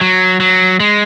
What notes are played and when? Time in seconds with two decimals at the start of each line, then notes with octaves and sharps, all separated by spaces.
0.01 F#3
0.40 F#3
0.80 G#3